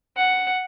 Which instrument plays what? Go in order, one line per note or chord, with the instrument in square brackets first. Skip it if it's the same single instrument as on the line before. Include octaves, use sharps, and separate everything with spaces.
[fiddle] F#5